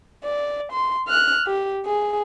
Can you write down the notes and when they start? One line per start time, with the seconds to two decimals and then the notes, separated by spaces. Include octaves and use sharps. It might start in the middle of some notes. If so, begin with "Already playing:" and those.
0.24 D5
0.72 C6
1.08 F6 F#6
1.47 G4
1.85 G#4